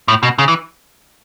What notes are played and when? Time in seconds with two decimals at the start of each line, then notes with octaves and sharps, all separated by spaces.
0.08 A2
0.23 B2
0.39 C#3
0.48 E3